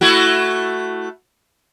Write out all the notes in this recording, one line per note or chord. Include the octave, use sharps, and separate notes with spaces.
A3 E4 F#4